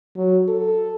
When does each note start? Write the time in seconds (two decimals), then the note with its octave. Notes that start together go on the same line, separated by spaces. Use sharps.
0.16 F#3
0.48 A4